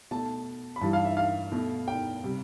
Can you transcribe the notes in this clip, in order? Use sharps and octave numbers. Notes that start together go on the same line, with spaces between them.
B2 A3 A5
B5
G2 E3 G3 A5
F5
E5
F5
B2 A3
G5
C3 G3